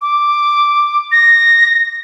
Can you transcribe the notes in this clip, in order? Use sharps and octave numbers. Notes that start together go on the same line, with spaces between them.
D6
A#6